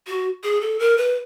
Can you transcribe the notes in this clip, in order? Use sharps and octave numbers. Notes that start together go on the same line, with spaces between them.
F#4
G#4
A4
A#4
B4